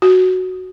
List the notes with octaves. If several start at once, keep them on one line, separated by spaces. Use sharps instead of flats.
F#4